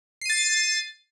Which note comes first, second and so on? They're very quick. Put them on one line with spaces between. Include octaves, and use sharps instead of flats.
C7 D#7 A6